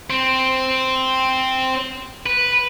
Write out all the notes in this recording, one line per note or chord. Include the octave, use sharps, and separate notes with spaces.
C4
B4